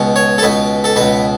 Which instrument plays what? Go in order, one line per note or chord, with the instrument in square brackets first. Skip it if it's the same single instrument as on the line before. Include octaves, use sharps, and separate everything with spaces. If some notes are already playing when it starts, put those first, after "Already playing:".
Already playing: [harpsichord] C#2 B2
C#5
A4
C#2 B2 B4
A4
C#2 B2 B4